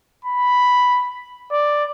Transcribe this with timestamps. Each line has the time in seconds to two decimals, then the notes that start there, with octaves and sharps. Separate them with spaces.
0.25 B5
1.51 D5